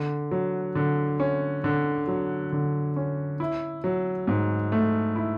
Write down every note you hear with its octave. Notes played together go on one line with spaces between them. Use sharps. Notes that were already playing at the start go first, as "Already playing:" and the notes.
Already playing: D3
F#3
D3
C#4
D3
F#3
D3
C#4
E4
F#3
G#2
A3
E4